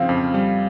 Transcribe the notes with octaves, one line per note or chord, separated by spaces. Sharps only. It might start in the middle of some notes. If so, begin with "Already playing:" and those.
Already playing: C#3 F3 C4 F5
F2
G3